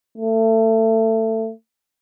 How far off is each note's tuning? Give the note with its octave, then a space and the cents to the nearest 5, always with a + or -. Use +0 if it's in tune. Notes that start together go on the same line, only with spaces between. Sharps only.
A3 +25